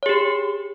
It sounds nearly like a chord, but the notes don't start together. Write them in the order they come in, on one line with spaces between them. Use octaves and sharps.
C#5 G#4 G4